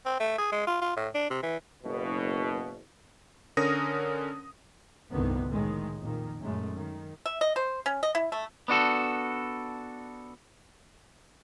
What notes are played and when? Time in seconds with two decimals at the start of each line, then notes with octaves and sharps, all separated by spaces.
0.06 C4
0.20 A3
0.38 G#4
0.52 G#3
0.67 F4
0.82 F4
0.97 A2
1.15 D4
1.31 C3
1.43 E3
1.83 F#1 B2
3.57 D3 C#4 A#4 D#6 A#6
5.11 F1 C2 G2 D3 D#3 B3
5.48 A2 D#3 G#3
6.00 F2 A#2 D#3
6.39 F#2 A#2 G#3 A3
6.73 D#3
7.26 E5
7.41 D#5
7.56 C5
7.86 C#4
8.03 D#5
8.15 E4
8.32 A3
8.68 B3 D4 F#4 A4